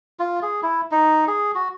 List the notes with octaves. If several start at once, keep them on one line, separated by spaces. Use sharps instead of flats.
F4
G#4
E4
D#4
G#4
F#4